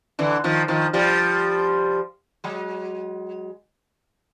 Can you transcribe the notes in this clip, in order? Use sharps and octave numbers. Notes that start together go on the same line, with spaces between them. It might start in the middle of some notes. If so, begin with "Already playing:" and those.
D3 E3
D#3 F3
D#3 F3
F3 G3
F#3 G#3